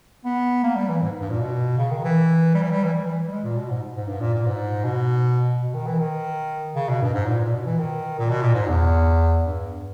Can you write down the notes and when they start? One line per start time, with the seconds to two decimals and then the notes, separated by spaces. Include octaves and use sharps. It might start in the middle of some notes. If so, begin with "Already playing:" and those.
0.25 B3
0.64 A#3
0.76 G3
0.89 E3
1.02 G#2
1.21 G2
1.30 A#2
1.40 B2
1.78 C#3
1.91 D#3
2.04 E3
2.54 G3
2.62 E3
2.70 G3
2.84 E3
2.93 G3
3.06 E3
3.28 G3
3.31 G#3
3.44 A#2
3.57 B2
3.70 G#2
3.96 G#2
4.07 G2
4.20 A#2
4.34 A#2
4.46 G#2
4.84 B2
5.62 B2
5.74 D#3
5.87 E3
5.99 D#3
6.75 C#3
6.89 B2
7.01 G2
7.14 G#2
7.26 A#2
7.40 A#2
7.52 B2
7.66 E3
7.78 D#3
8.19 A#2
8.29 B2
8.42 A#2
8.55 G#2
8.68 E2
9.44 G2